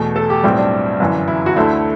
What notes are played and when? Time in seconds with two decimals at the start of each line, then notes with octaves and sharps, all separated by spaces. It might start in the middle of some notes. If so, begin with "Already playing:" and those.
Already playing: E2 B2 A3
0.16 A4
0.30 G4
0.43 B1 A2 G3 C4
0.58 D4
1.00 G1 F#2 E3
1.28 E4
1.46 F#4
1.56 D2 D3 A3 E4